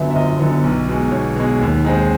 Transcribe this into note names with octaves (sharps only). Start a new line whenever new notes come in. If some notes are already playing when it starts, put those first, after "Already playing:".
Already playing: G1 F#2 D3 F#3 B3 E5
E5
G1 D#5
F#2 D3 F#3 B3
B1
B2 G#3
B1 C#5
B2 G#3
D#2
D#3 G#3 C4